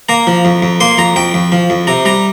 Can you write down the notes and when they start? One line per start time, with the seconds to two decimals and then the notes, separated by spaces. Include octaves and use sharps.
0.09 A#3 A#5
0.27 F3
0.45 F2
0.62 F2
0.80 A#3 C6
0.98 F2 A#5
1.16 F2 G5
1.34 F2
1.52 F3
1.70 F2
1.87 C3 A#5
2.05 G3 A#5